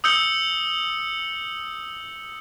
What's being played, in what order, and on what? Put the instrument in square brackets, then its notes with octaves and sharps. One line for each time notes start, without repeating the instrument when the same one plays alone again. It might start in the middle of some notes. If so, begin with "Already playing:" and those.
[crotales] D#6 E6 G6 C#7 G7